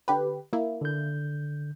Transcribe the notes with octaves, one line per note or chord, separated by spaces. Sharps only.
D3 G4 B4
A#3 E4
D3 G6